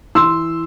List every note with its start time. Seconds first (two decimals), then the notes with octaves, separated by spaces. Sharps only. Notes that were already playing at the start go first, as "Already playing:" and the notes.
0.15 E3 C6 E6